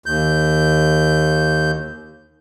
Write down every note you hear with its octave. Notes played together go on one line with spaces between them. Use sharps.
D#2 G6